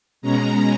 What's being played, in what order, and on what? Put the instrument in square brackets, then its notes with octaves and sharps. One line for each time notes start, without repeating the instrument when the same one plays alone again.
[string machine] B2 G#3 C#4 A#5